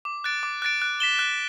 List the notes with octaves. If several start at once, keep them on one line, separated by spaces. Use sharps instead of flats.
D6
F#6 A6 D7
D6
F#6 A6 D7
F#6
B6 E7 G7
F#6